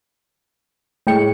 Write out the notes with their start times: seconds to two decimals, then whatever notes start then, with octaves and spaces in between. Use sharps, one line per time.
1.07 A2 G#3 A3 G5 C#7